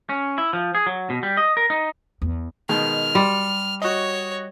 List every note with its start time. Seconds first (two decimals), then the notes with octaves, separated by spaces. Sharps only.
0.09 C#4
0.38 E4
0.53 F3
0.75 G#4
0.86 F#3
1.10 B2
1.23 G3
1.37 D#5
1.57 A#4
1.70 D#4
2.22 E2
2.69 B2 D#3 G#3 F6
3.15 G3 C6
3.82 F#4 C#5 D#5